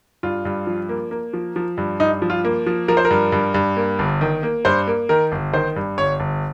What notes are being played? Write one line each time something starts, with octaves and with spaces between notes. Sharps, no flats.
G2 F4
G2
F3
A#3
A#3
F3
F3
G2
G2 D#4
F3
F4
A#3
F3
F3 A#4
C5
A#4
G2
G2
G2
A#3
G1
D#3
A#3
G2 C5
A#3
D#3 A#4
G1
D#3 C5
G2
G1 C#5
G1